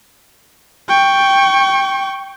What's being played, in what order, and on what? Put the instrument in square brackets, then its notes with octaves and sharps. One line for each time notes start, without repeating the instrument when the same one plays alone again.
[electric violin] G5 C#6